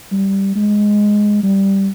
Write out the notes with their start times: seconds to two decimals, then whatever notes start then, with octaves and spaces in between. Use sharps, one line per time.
0.12 G3
0.55 G#3
1.43 G3